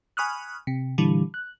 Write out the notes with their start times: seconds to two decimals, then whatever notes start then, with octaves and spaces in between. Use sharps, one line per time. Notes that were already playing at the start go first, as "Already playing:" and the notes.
0.17 G#5 B5 C#6 D#6 F6 F#6
0.67 C3
0.98 A#2 D3 E3 G3
1.34 F#6